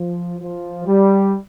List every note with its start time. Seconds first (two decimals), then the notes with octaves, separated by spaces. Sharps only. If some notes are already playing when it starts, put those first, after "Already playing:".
Already playing: F3
0.39 F3
0.85 G3